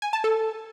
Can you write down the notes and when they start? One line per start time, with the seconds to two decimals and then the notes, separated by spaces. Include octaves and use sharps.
0.02 G#5
0.13 A5
0.24 A4